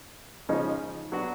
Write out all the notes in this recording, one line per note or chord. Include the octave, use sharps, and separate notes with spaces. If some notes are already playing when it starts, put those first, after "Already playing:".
C#3 F3 G#3 C#4 D#4
F#3 B3 D4 F#4